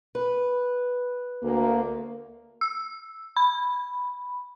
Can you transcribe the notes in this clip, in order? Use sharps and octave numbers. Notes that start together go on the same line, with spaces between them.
B4
D2 A#3
E6
B5